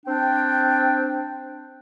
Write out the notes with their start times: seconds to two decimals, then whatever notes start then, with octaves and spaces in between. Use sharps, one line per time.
0.06 C4 D4 G5